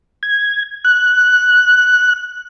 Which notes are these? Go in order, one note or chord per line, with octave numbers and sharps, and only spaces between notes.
G#6
F#6